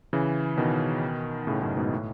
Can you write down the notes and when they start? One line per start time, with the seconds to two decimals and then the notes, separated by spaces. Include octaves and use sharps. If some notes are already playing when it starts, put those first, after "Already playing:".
0.13 C#3 E3
0.57 B2 D#3
1.47 A2 C#3
1.61 F#2 A2
1.77 G#2 B2
1.92 A2